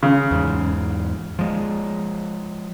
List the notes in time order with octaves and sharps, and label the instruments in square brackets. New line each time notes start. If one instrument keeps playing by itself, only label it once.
[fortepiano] C#3
[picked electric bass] E2 G#2
F3 G#3